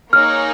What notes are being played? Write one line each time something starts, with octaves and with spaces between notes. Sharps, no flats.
A#3 D#4 G#4 C#5 F6